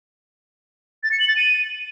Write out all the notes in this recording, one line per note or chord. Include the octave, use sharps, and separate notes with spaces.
A6
C#7
F#7
A6
D#7